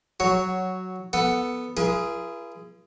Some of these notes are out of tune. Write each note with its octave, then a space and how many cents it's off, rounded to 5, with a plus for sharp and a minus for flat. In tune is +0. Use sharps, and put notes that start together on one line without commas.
F#3 +5 F#4 +0 C#5 +0
B3 +0 A4 +0 F#5 +0
F4 -45 G#4 +0 B4 -45